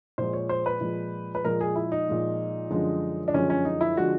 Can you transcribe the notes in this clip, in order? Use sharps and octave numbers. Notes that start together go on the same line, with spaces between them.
A#2 F3 G#3 C5
C#5
C5
B4
A#2 F3 G#3
B4
A#2 F3 G#3 A#4
G#4
E4
D#4
A#2 F3 G#3
F#2 D3 F3 G#3
D4
F#2 D3 F3 G#3 C#4
C#4
D#4
E4
D3 F3 G#3 F#4